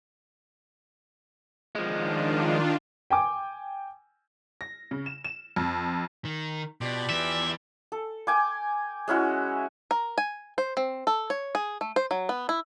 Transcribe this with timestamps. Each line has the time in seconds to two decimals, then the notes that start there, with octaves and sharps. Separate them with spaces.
1.75 D#3 F3 G#3 D4 F4
3.10 G5 G#5 D6
4.61 A#6
4.91 C#3
5.06 E7
5.25 E7
5.56 F2
6.25 D#3
6.81 B2 F3 G4 D5
7.09 E3 B3 E5
7.92 A4
8.27 G5 G#5 D6
9.08 G#3 C#4 E4 F#4
9.91 A#4
10.18 G#5
10.58 C5
10.77 C4
11.07 A4
11.30 C#5
11.55 G#4
11.81 A3
11.96 C5
12.11 F#3
12.29 B3
12.49 E4